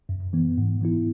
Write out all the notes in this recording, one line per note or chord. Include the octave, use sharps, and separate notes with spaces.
F#2
E3 B3
G#2
E3 B3 E4